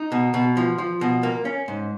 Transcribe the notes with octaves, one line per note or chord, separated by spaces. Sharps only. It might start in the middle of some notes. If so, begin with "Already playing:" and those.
Already playing: D#4
B2
B2
F3
F3
B2
A#3
C#4
G#2